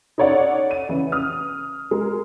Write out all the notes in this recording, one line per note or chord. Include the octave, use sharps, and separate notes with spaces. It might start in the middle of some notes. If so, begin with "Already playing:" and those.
D#4 A4 C#5 D5 F#5
D#7
C#3 E3
D#6 F6
G#3 A#4